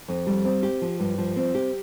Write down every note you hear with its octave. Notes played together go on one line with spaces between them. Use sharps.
F2
G3
C4
G4
F3
G2
F3
C4
G4